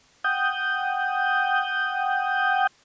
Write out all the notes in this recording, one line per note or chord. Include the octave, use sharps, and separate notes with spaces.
F#5 G5 D#6 G6